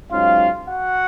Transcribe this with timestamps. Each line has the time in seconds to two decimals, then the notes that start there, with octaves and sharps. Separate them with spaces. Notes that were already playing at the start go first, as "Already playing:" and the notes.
0.11 G#2 F#3 C#4 F4 F5
0.66 F#4 F#5